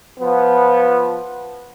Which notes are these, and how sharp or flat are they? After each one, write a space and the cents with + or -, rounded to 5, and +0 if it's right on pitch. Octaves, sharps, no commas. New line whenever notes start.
F3 +0 B3 -10